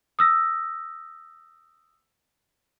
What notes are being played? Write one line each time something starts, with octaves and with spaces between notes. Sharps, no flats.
D#6 E6 A#6